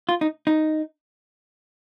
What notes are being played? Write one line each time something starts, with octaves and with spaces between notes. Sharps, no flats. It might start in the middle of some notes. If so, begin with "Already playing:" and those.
F4
D#4
D#4